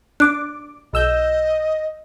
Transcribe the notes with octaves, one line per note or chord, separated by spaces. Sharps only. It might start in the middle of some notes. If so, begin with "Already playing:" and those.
D4 D6 F#6
B1 D#5 E6 G6